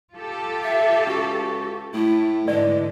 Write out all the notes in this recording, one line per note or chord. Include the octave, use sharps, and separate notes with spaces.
F4 G4 A4
E5
C#2 F#4
A2 A3 E4
G#2 D3 E3 G#3 D5